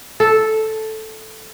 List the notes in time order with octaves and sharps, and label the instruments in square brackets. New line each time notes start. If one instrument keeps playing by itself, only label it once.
[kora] A4